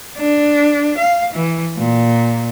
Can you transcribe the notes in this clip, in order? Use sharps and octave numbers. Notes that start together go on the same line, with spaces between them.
D4
F5
E3
A#2